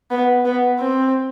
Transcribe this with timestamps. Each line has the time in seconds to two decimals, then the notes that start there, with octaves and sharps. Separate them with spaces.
0.11 B3
0.46 B3
0.79 C4